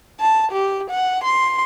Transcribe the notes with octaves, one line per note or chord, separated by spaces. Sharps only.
A5
G4
F#5
C6